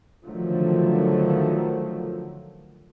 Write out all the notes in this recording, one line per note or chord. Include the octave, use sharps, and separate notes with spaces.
D3 D#3 F3 F#3 A3